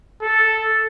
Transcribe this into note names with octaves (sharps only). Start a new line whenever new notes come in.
A4